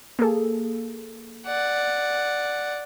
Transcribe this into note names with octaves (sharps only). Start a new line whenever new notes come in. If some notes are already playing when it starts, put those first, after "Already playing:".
A#3 G#4 A4
D5 F#5